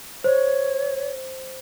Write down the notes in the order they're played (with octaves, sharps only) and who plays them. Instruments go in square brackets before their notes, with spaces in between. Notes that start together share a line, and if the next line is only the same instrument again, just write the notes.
[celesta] C5 [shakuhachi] C#5